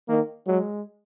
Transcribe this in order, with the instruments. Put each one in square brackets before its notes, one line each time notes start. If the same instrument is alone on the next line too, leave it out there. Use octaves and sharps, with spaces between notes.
[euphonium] D#3 [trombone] A#3
[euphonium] F#3 [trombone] G#3